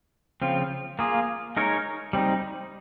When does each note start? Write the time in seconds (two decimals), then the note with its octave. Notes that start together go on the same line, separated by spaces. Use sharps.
0.42 C#3 F3 C4 F4
0.99 A#3 F4 G#4
1.57 G#3 D#4 A#4 C#5
2.13 G3 C4 D#4